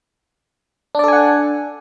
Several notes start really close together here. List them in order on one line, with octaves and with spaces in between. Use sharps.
D4 D5 A4 G#5 F#5